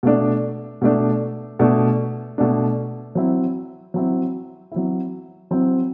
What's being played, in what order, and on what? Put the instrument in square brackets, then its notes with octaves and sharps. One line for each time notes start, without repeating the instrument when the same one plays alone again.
[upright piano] B2 A3 D4
B2 A3 D4
B2 A3 D4
B2 A3 D4
F#3 C4 E4
F#3 C4 E4
F#3 C4 E4
F#3 C4 E4